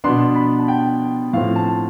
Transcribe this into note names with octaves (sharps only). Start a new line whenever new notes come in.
B2 B3 D4 C6
B5
A5
G5
A2 F3 C4 F5
A5